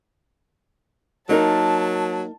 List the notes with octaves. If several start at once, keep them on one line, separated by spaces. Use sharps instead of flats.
F#3 A#3 D#4 A#4 A5